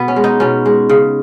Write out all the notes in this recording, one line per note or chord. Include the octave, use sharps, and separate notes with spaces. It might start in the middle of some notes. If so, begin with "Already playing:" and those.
Already playing: B2 B3
C#4
G#3
D#4
B2 C#4
G#3
C#3